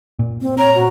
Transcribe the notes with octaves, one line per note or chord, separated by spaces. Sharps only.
A#2
C4
C#5 A#5
F#4